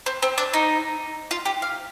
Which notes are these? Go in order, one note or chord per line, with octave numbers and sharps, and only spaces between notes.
C4
C4
D4
D#4
F4
G4
F5